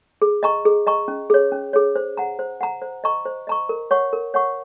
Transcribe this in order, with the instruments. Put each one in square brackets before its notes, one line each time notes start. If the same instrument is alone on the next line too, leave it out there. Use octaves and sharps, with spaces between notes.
[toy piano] G#4
D#5 A#5 C#6
G#4
D#5 A#5 C#6
C#4
G#4 C#5
C#4
G#4 C#5
C5
F#5 A#5
C5
F#5 A#5
C5
D#5 A#5 C#6
C5
D#5 A#5 C#6
A#4
C#5 F#5 C#6
A#4
C#5 F#5 C#6